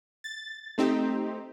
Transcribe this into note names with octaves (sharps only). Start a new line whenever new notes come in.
A6
A3 C4 D#4 G4